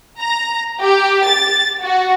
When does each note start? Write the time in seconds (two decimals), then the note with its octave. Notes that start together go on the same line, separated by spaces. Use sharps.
0.19 A#5
0.80 G4
1.28 A6
1.83 F#4